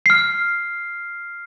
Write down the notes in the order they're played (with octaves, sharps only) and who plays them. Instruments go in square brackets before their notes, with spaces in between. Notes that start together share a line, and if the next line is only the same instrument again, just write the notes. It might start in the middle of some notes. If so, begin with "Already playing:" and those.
[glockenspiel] F6 C7